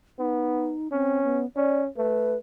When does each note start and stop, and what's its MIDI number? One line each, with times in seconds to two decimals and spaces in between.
0.19 0.74 59
0.19 0.88 63
0.92 1.23 60
0.92 1.43 61
1.24 1.46 59
1.57 1.87 61
1.57 1.81 74
1.97 2.36 57
1.97 2.38 71